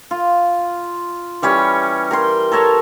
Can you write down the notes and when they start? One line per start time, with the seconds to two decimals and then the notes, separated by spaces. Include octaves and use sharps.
0.11 F4
1.42 E3 G3 C#4 C#5
2.11 A#4 G5 C6
2.52 A4 A#4 C#5 A5